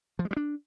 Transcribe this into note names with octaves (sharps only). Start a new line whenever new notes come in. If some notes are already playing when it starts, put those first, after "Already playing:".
F3
G#3
G3
D4